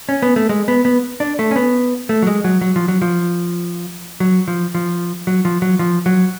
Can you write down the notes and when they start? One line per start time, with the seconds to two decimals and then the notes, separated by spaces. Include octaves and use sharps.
0.09 C#4
0.22 B3
0.36 A3
0.49 G#3
0.68 B3
0.85 B3
1.20 D4
1.39 A3
1.51 C#4
1.56 B3
2.09 A3
2.22 F#3
2.27 G#3
2.44 F#3
2.61 F#3
2.76 F3
2.88 F#3
3.02 F3
4.20 F#3
4.48 F3
4.75 F3
5.27 F#3
5.45 F3
5.62 F#3
5.79 F3
6.06 F#3